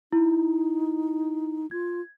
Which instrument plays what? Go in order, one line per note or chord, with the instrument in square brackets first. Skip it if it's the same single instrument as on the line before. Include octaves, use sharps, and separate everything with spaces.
[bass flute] D#4 [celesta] E4
[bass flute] F4 [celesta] G#6